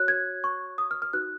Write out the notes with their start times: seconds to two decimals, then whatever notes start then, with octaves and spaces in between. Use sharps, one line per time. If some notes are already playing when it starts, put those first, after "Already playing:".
Already playing: F#4 C#5 F#6
0.08 G#6
0.44 C#6
0.78 D#6
0.91 F6
1.02 F6
1.13 D#4 F#4 B4 F#6